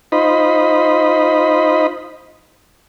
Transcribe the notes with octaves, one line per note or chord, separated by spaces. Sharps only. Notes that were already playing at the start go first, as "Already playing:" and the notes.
D#4 F4 C5 D#5 B5